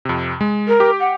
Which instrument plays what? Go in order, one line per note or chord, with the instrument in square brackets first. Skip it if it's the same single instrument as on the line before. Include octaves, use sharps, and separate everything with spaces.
[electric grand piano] F2 C3
G#3
[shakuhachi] A#4
[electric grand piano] G4 D6
[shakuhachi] F#5